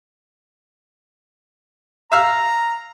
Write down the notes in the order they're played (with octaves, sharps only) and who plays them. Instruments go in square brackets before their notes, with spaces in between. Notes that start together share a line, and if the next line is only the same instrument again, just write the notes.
[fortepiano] E5 F5 [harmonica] A#5